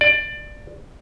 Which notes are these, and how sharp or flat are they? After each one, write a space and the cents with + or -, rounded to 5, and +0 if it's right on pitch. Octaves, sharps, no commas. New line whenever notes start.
D5 +15